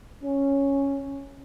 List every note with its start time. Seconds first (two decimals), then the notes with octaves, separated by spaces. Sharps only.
0.24 C#4